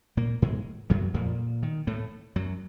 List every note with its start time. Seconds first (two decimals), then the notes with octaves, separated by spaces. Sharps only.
0.17 A#2 A#3
0.42 G#2 G#3
0.90 F#2 F#3
1.14 F2 A#2 F3
1.63 D#3
1.87 A2 A3
2.36 F#2 F#3